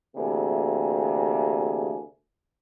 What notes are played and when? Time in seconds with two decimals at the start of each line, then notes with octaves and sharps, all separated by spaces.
0.16 D2 C3 E3 A#3 G#4